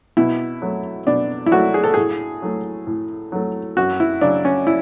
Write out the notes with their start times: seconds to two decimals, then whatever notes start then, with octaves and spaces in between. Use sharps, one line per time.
0.17 B2 E4
0.62 F#3 A3
1.07 B2 D4
1.46 E4
1.51 F#3 A3 F#4
1.74 G#4
1.84 A4
1.94 A2 G#4
2.42 F#3 A3
2.87 A2
3.32 F#3 A3
3.77 F#2 F#4
4.00 E4
4.21 C#3 F#3 D4
4.45 C#4
4.67 E4